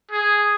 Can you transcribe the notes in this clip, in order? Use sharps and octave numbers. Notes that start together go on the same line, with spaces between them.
G#4